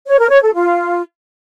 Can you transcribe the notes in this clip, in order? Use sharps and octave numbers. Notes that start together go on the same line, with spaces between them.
C#5
A#4
C#5
A4
F4